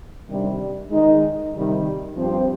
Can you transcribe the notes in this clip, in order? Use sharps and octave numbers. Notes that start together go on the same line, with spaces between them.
C3 D#3 G3 D4
D#3 G#3 D#4
C3 D#3 G3
G2 F3 C4 G4 C5